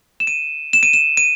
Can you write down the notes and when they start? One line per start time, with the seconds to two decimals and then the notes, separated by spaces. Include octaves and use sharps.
0.20 E7
0.27 D#7
0.73 E7
0.83 D#7
0.93 E7
1.17 D#7